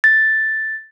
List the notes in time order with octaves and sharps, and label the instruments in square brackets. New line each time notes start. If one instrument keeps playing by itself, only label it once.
[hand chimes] A6